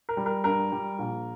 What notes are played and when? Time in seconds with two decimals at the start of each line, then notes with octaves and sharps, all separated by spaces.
0.09 A#4
0.17 G3
0.26 A#4
0.44 G2 A#4
0.72 G3
0.99 A#1